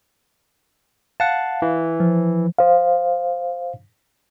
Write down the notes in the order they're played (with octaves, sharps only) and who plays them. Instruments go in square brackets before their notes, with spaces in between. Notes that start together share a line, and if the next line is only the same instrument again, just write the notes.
[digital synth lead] F5 [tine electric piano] F#5 A5
[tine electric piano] E3
[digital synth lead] F3
[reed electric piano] C5 F5